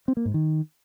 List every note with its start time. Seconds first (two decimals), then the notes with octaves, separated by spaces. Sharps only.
0.08 C4
0.17 A#3
0.25 G#2
0.34 D#3